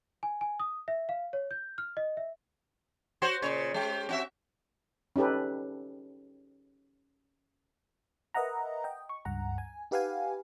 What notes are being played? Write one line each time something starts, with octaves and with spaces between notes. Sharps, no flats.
G#5
G#5
D#6
E5
F5
C#5
G6
F6
D#5
E5
F#4 C5 C#5
A#2 C#3 C#5
G#3 G4
C4 F#4 E5
C#4 D#4 G4 A4 B4
A#4 B4 D#5 E5 F#5 A#5
D#5 G5
C#6
C#2 G2 F#5 A#5
G#5
D#4 G4 B4 F5 F#5 G#5